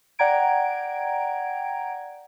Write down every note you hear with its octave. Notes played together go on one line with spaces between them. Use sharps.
D5 F#5 G5 A#5 G#6 D7